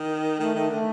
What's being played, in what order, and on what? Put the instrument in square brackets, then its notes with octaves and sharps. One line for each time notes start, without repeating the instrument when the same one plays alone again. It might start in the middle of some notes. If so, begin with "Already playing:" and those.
Already playing: [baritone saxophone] D#3
[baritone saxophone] D#3 [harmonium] A3
[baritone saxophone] D#3 [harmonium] A3
[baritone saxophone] D3 [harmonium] A3